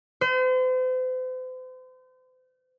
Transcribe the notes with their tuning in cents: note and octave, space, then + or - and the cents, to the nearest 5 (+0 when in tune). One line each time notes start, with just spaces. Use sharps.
C5 -40